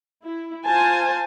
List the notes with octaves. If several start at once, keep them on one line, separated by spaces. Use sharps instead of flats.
E4
F4 C5 G#5 A5